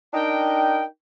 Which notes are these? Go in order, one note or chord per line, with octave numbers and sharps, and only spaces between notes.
D4 D#4 A#4 G5